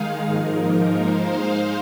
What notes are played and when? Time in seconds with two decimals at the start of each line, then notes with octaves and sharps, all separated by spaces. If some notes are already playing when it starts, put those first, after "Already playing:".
Already playing: D#3 G#3 D#4 G#4 F5
0.25 G#2 F3 A#3 D#4 A#4
0.98 G#3 D#4 C5 F5